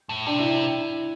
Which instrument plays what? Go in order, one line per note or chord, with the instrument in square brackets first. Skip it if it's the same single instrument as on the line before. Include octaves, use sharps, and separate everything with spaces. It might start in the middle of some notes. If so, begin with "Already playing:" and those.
[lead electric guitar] A2
[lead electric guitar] C3 [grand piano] D4
[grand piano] E4